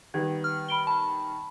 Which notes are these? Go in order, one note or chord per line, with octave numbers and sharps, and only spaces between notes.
D#3 G3 B3 G#6
F6
B5 D7 G7
A5 B5